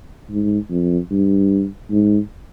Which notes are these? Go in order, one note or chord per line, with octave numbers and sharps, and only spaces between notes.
G#2
F2
G2
G#2